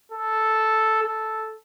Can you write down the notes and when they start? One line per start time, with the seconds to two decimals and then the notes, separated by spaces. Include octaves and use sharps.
0.12 A4
1.02 A4